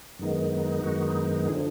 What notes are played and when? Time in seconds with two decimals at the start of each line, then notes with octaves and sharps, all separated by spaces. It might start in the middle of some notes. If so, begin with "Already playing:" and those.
0.19 F#2 D#3 G#3 B3 D#4
0.84 F#2 D#3 G#3 B3 D#4 F#4
1.48 D3 F3 G#4